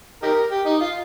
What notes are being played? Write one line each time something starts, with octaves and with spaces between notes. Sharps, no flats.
D#4 G4 A#4
G4
D#4
F4